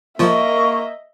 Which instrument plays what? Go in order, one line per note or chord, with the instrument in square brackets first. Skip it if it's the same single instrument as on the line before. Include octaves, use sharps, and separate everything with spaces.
[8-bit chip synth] F3 F4 [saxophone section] A#3 [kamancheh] D#5 E5 [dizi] C#6